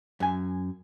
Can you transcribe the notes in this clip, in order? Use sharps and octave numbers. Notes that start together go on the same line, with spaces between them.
F#2 G#5